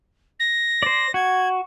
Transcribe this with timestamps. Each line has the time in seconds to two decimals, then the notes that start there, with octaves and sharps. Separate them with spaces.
0.39 A#6
0.83 C5 D5
1.14 F#4 G#6